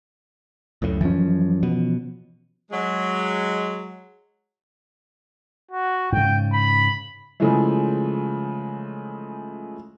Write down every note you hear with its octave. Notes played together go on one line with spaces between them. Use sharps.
C#2 F#2 A2
F#2 E3 F3 C#4
B2
F#3 G#3
F#4
G#2 C#3 G5
B5
C#3 E3 F3 G#3 A3